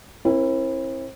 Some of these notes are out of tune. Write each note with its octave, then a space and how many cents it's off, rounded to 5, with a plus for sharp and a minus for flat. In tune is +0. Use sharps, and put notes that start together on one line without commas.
C4 +40 E4 +0 A#4 +15